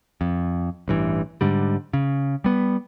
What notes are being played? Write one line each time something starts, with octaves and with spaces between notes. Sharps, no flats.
F2
A1 G2 E3
G#2 D3 G3
C#3
G3 B3